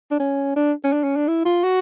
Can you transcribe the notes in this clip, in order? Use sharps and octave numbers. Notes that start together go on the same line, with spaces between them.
D4
C#4
D4
C#4
D4
C#4
D4
E4
F4
F#4